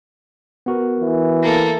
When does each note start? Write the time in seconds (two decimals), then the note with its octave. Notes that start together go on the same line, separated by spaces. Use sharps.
0.66 B3 F#4 A#4
1.00 E3
1.43 A#3 A4